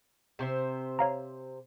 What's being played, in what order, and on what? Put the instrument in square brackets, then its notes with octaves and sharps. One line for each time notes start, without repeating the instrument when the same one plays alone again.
[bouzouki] C3 C5 E5
[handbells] C#5 F5 A#5